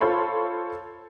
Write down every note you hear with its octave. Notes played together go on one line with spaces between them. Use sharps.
F4 A4 C5 C#5 B5 C6